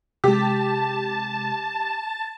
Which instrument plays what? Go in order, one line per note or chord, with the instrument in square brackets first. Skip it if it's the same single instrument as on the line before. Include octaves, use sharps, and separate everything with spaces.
[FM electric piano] C3 G#3 [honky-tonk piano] G4 [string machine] A5